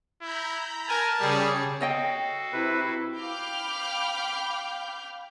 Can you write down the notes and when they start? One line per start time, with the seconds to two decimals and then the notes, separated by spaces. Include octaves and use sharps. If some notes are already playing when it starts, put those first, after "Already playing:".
0.22 E4 A#5 B5 G6
0.88 A#4 G#5 A5
1.20 C#3 G3 G#4 C#5 C#7
1.81 F#4 A4 C#5 D#5 F5 G5
2.53 C3 E4 B4
3.17 F5 G5 B5 D6 F6 G6